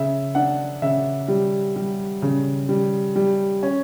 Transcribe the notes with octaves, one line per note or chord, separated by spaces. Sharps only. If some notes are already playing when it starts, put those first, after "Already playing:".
Already playing: C#3 E5
D4 F#5
C#3 E5
G3
G3
C#3
G3
G3
C#4